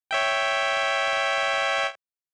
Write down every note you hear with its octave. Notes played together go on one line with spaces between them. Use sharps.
C#5 E5 G5